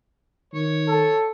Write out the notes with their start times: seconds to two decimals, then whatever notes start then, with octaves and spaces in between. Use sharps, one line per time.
0.54 D#3 C#5
0.88 A4